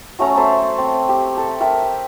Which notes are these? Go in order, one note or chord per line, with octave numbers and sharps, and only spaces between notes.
F#3 A3 C#4 A#5
A4 C5 E5
C4
G4
A4
A#4 E5 G5